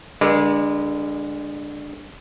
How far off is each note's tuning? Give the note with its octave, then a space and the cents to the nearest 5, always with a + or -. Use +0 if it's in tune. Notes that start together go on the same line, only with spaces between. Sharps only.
D3 +0 G#3 -30 B4 -45